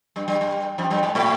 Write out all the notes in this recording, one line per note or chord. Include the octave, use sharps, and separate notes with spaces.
G2 G3
G2 G3
G2 G3
F2 F3
G2 G3
G#2 G#3
A2 A3